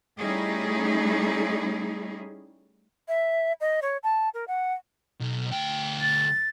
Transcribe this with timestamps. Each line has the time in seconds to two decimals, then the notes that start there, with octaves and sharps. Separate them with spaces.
0.19 G3 A3 C#4 D#4 E4 G#4
3.08 E5
3.61 D#5
3.82 C#5
4.03 A5
4.34 A#4
4.48 F#5
5.20 B1
5.51 D2 G5
6.01 A6